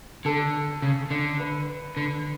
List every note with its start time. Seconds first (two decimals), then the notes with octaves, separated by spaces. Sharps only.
0.25 D3 A4
0.82 C#3
1.11 D3
1.40 B4
1.97 D3